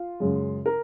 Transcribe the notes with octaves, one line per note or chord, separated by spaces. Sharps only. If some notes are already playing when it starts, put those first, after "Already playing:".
Already playing: F4
F#2 C#3 G#3
A#4